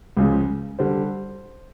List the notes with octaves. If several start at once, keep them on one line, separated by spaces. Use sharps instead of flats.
C#2 C#3 F3 G#3
D3 G3 C5